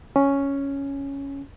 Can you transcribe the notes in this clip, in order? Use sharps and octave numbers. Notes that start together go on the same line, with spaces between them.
C#4